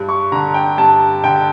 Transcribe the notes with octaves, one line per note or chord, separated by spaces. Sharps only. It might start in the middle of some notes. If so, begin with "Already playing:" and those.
Already playing: G2
C#6
D3 A#5
G5
G2 A5
D3 G5